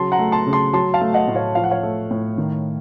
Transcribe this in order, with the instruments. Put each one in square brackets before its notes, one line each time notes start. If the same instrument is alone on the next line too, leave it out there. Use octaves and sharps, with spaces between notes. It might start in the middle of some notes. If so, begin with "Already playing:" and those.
Already playing: [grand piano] C#3 F#3 A5 C6
F#5 A#5
A3
A5 C6
C#3
A5 C6
F#3 A5 C6
F5 A5
A3
D#5 F#5
A2
C#5 F5
F3 F5
F#5
C#5 F5
A3
A2
D#3